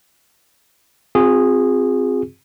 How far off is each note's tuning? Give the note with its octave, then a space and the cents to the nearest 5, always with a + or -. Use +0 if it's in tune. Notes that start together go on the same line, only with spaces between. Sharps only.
C4 +0 F4 +40 G#4 -10